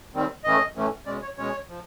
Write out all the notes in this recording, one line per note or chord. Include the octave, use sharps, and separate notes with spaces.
D#2 D#3 G3 C4
A2 E3 A3 C#4 D#5
A2 E3 A3 C#4
B2 G#3 C#4 D5
C#5
B2 G#3 C#4 C#5
F3